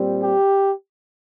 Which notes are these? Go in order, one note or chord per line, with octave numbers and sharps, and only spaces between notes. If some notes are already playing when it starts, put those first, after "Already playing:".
Already playing: A#2 G3 C4
G4